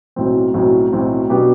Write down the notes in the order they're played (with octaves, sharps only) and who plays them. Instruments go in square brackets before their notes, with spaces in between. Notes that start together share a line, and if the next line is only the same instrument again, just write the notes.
[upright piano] B1 A2 F#3 C4
B1 A2 F#3 C4
B1 A2 F#3 C4
B2 F#3 B3 D4 G4